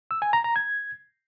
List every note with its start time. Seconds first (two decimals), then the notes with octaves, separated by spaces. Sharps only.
0.11 E6
0.22 G#5
0.33 A#5
0.44 A#5
0.56 G#6